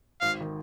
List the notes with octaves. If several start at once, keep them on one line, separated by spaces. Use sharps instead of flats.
G#1 F5
D#3